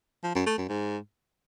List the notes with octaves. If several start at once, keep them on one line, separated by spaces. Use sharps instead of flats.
F3
F#2
A3
F#2
G#2